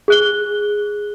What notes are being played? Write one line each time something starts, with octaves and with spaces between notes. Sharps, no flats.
G#4 F#6 G7